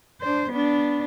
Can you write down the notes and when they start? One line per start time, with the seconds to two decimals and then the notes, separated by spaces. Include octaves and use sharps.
0.21 D4 C5
0.51 B3 D4